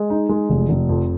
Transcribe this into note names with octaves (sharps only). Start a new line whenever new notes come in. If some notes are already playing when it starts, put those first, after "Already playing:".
Already playing: G#3
D#4
G#3
F1
F1
F2